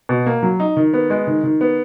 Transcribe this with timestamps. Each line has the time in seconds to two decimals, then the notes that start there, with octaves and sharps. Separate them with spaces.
0.09 B2
0.26 A#3
0.43 F#3
0.60 D#4
0.77 D#3
0.94 B3
1.10 G#3
1.27 D#3
1.44 D#3
1.61 B3